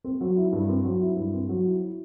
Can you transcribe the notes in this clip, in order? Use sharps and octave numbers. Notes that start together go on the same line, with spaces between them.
C4
F#3
E4
G2
C4
F#3
E4
G2
C4
F#3
E4